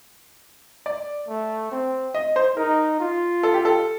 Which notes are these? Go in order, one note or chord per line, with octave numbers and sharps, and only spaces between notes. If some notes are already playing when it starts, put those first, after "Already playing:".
D5
A3
C4
D#5
C5
D#4 A#4
F4
A4
G4
A4